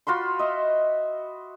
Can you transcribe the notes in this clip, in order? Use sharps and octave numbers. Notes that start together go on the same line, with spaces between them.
F4 F#4 B5 C6
D#5 E5